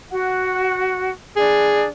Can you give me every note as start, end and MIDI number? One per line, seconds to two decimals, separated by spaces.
0.11 1.10 66
0.11 1.10 78
1.36 1.86 62
1.36 1.84 68